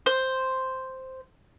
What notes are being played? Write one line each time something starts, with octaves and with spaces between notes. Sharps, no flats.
C5